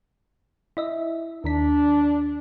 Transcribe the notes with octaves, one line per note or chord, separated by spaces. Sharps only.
E4 D#5 E5
D#2 D#3 D4 B6